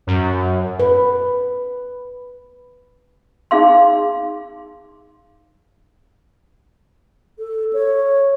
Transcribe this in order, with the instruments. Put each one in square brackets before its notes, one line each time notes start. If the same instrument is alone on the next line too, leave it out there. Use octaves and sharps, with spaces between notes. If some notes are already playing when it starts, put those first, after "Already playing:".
[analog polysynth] F#2
[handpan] B4
[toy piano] D#4 G#4 F5 C6
[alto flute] A4
C#5